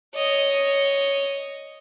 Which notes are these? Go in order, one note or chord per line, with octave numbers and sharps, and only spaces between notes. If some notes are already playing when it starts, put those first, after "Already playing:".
C#5 D#5